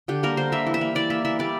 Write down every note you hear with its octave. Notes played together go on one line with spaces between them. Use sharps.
D3 G4
G3 A#3 A#4
D3 C5
G3 A#3 E5
E3
E5
A#3
E3 D5
A#3 E5
E3 E5
G3 A#3 D5